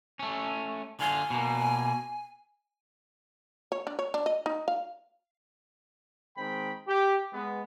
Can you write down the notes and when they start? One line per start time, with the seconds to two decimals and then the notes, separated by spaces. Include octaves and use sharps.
0.19 A3 C#4
1.00 D3 F4 G#5
1.30 B2 A#3
3.72 C#5
3.87 D4
3.99 C#5
4.14 D4
4.26 D#5
4.46 D#4
4.68 F5
6.37 D#3 G#3 C4 G5 B5
6.88 G4
7.33 G#3 B3